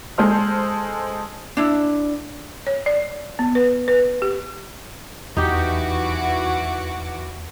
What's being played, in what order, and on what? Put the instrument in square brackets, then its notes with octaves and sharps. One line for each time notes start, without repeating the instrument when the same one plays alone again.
[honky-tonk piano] G#3 A4 C5 F6
[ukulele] D4 E4
[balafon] C#5
D5
B3
B4
B4
G4
[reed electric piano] E2 [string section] E3 F#4 D6 [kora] D#4 G4